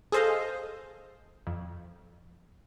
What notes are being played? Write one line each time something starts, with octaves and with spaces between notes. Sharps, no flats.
G#4 A4 C5 D#5 F5
F2